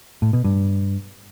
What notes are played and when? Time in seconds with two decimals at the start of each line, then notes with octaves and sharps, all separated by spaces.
0.22 A2
0.33 B2
0.44 G2